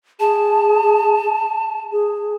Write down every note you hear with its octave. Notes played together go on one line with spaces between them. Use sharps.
G#4 A5
G#4